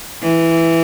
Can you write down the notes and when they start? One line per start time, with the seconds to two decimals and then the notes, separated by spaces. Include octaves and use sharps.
0.22 E3